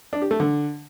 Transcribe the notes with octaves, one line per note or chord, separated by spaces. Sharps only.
D4
G4
A3
D3